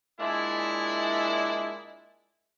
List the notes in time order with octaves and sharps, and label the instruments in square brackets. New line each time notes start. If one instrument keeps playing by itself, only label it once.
[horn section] A#2 G#3 D4 E4